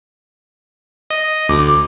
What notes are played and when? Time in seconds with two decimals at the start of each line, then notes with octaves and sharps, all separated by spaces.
1.10 D#5
1.49 D2 D6